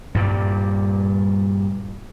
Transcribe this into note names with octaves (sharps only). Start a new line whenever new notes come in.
G2 A#2 G3